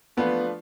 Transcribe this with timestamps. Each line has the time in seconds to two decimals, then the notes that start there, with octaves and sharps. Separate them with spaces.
0.17 F3 A3 B3 D4 F4 B4